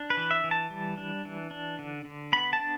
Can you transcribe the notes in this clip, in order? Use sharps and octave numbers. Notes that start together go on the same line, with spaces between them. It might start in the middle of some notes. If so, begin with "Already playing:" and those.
Already playing: D4
B4
E3
E5
E3
A5
G3
D4
E3
D4
D3
D3
B3 B5
A5
D4